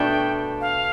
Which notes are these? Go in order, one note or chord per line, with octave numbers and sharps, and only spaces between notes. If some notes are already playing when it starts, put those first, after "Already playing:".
Already playing: B2 A3 D4 G5
F5